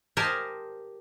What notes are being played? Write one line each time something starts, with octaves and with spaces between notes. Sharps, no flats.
G4 A#4 C5 D#5 G#5 A5